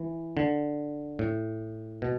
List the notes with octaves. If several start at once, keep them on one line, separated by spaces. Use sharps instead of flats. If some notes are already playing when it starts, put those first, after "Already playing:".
Already playing: E3
D3
A2
B2